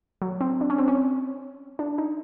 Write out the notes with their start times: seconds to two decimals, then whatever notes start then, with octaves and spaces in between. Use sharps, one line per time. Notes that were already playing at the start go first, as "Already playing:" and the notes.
0.22 F#3
0.41 C4
0.61 D4
0.70 C#4
0.78 C4
0.88 C#4
1.79 D4
1.98 D#4